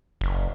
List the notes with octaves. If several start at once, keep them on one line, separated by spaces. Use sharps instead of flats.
F#1